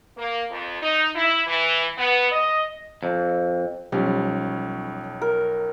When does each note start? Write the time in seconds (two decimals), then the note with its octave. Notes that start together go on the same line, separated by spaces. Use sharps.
0.17 A#3
0.50 F2
0.81 D#4
1.15 E4
1.48 E3
1.98 B3
2.31 D#5
3.03 F2
3.92 B1 F3 G3 C#4
5.21 A#4